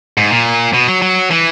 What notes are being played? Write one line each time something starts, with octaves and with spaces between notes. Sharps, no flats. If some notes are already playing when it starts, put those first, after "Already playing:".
G#2
A#2
B2
F#3
F#3
E3